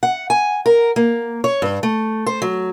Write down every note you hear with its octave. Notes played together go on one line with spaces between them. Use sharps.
F#5
G#5
A#4
A#3
C#5
G2
A3
C5
F#3